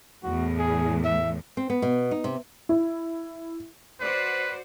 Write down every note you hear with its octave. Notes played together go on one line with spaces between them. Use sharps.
E2 A2 F#4
G#4
E5
C4
B3
B2
D#4
C3
E4
F#4 B4 C5 D5